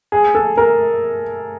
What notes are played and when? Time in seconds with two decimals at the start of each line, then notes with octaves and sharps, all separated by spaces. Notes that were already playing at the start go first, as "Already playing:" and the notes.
0.12 G#4
0.35 A4
0.57 A#4